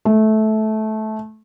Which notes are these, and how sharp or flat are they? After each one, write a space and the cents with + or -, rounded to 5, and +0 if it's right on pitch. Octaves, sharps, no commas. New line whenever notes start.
A3 -15